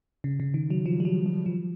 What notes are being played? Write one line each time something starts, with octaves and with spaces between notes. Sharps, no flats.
C#3
C#3
D#3
F#3
F3
G3
F#3
F#3
F3